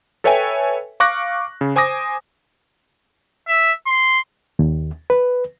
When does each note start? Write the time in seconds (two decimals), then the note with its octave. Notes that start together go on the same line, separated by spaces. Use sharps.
0.24 A4 B4 C#5 E5 G5 G#5
1.00 F5 C#6 D6 F#6 A#6
1.61 C#3
1.76 C5 G#5 D6 D#6 A#6
3.48 E5
3.87 C6
4.59 D#2
5.10 B4